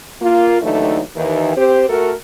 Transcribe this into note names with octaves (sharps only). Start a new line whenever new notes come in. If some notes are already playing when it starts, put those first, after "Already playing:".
A#3 F4
D#2 D3 E3 F#3 A3 D#4
D#2 D#3 E3
C4 G4 C5
A3 F#4 A4 A#4